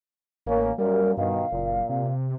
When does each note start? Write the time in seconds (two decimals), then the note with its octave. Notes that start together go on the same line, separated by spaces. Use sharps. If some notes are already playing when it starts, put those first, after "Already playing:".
0.46 A1 A#3 C#4
0.78 F#2 A#2 G3 A#4
1.17 G2 B2 D#3 F5
1.52 F#1 A#2
1.90 C3